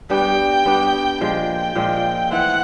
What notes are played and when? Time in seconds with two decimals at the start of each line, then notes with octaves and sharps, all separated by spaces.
0.10 G3 B3 D4 G4 G5
0.65 G3 B3 D4 G4
1.21 A#2 F3 G#3 G5
1.75 A#2 F3 G#3
2.31 E3 A3 C4 F#5